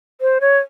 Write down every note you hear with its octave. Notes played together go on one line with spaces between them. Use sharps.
C5
C#5